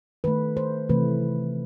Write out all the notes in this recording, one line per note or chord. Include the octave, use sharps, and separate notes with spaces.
D#3 A3 B4
C5
C3 E3 A3 B4